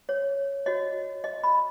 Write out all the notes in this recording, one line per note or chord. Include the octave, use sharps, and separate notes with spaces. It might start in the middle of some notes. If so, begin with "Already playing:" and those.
C#5
F#4 C#5 D#5
D#5
B5